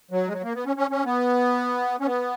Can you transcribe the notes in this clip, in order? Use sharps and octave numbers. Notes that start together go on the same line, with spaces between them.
F#3
G#3
F#3
A#3
B3
C#4
C#4
C#4
B3
C#4
B3